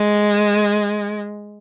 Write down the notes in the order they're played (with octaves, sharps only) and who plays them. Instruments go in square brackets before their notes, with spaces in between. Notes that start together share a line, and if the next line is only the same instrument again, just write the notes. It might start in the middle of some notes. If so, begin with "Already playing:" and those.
Already playing: [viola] G#3